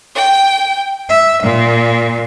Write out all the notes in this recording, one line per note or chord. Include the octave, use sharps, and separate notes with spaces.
G5
E5
A#2